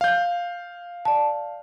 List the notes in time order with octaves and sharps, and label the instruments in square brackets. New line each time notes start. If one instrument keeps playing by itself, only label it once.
[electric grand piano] F5 G6
[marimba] D5 A5